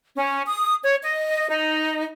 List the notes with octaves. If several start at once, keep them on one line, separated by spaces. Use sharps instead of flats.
C#4
D#6
C#5
D#5
D#4